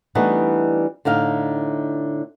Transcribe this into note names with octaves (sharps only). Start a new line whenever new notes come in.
E3 G3 A3 B3 D4 D#4
A2 D3 D#4 F5